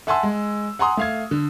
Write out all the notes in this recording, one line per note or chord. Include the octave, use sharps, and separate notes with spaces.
E5 F#5 G#5 A5 C6 E6
G#3
F#5 G#5 A#5 C6 D#6
A3 F5 G#6
D3